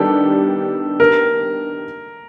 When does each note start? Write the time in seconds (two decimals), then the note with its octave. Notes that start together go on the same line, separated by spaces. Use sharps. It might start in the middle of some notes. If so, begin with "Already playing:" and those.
Already playing: D#3 G3 B3 D4 G4 A4
1.00 A#4